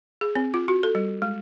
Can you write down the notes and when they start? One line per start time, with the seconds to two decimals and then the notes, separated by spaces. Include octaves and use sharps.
0.21 G#4
0.35 C4
0.54 F4
0.68 F#4
0.83 A4
0.95 G3
1.22 G#3